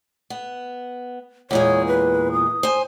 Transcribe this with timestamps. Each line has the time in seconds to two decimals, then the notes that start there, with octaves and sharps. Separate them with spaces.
0.30 B3
1.51 E2 A#2 G#3 C#5
1.87 B4
2.33 D#6
2.63 C5 G#5